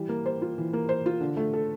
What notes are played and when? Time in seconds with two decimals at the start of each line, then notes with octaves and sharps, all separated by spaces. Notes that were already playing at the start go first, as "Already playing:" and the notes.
Already playing: E3 G3
0.09 A#3
0.26 C5
0.42 F4
0.58 E3
0.73 A#3
0.89 C5
1.06 F4
1.21 D3
1.37 A3
1.53 A4